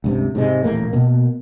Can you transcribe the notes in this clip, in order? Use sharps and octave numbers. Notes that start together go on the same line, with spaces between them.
C#2 G2 C3
G#2 C3 G#3
D#1 A1 A3 A#3
B2 A#3